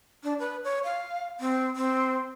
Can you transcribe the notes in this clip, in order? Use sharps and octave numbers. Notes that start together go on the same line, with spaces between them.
D4
B4
C#5
F5
C4
C4